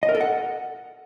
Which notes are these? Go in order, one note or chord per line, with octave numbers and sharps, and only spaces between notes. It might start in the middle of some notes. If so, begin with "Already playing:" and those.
D#5
A#4
A4
F#5